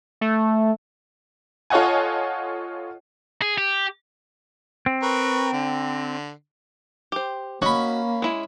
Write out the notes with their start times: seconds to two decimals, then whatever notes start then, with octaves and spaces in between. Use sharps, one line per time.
0.21 A3
1.70 F4 A4 C#5 D#5 F#5 G#5
3.42 G#4
3.58 G4
4.86 C4
5.03 A#4 B4 C#6
5.53 D3
7.12 G4 C5
7.62 A#3 C#4 F#4 D#5 B5
8.22 G#3 E4